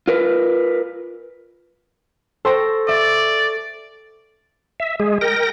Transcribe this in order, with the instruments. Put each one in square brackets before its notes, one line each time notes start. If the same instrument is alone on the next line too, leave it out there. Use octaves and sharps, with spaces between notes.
[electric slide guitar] F4 A#4 B4
[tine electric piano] A4 C#6 [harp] C5 G5 A#6
[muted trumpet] D5 [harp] E5
[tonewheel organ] E5
G#3 G#4
A#4 G5 A#6